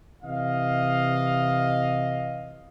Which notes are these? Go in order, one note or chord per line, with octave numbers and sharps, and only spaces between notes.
C3 E3 D#5 F5